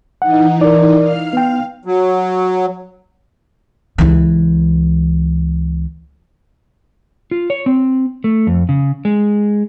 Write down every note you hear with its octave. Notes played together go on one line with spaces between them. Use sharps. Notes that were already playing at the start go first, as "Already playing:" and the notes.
E3 D#4 F#5
A#4 D5
F5 F6
B3 G5
F#3
C#2 E3
F4
C#5
C4
A3
F2
C#3
G#3